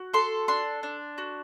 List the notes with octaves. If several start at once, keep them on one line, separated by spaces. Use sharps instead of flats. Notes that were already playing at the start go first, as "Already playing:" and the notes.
Already playing: F#4
A4 C6
D4 C6
D4
F#4